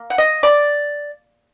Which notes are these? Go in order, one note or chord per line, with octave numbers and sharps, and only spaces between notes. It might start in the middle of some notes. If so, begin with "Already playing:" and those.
Already playing: A#3
F#5
D#5
D5